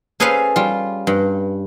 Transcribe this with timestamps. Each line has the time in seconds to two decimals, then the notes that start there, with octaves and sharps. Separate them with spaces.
0.20 C#4 G#4 A4 B4 C5 F5
0.56 G3 F4
1.07 G2